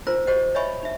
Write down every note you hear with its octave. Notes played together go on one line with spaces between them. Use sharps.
D#4 F4 A#4 C5 A#5
F#4 G4 C5 D#5 F#5
C#5 D#5 E5 G#5 B5 C#6
D#4 E5